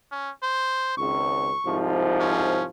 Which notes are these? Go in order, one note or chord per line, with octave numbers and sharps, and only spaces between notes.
C#4
C5
G#1 C#2 C#6
C2 G#2 F3
C#4